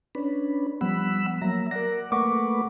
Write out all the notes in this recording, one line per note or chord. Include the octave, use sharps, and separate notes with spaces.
C#4 D4 B4
F3 G3 B3 F#5 B5 E6
F#3 A#3 E5 A#5
A#4 D5 F#5 A#6
A3 A#3 B4 F#5 C#6 D6